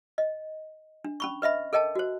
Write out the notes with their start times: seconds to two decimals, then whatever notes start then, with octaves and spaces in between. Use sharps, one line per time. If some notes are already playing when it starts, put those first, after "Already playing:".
0.18 D#5
1.04 D4
1.20 C#4 B5 C#6
1.42 B4 D#5 E5 B5
1.73 A4 A#4 D#5 G5 A5
1.95 F#4 C5